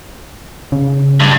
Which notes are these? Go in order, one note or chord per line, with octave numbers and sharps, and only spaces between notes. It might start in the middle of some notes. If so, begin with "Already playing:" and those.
C#3
G2